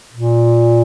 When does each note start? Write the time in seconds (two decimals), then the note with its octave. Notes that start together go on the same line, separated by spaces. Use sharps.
0.13 A#2